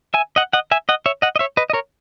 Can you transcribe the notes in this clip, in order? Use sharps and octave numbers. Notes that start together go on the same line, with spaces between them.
E5 G#5
D#5 F#5
D#5 F#5
E5 G#5
D#5 F#5
C#5 E5
D#5 F#5
D#5
C#5 E5
B4 D#5
D#5
A#4 C#5